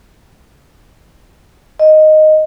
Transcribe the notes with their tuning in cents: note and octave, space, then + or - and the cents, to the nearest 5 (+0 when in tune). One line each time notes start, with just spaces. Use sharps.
D#5 -5